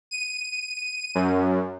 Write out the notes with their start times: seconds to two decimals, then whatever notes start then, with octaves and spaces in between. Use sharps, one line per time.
0.11 D#7
1.15 F#2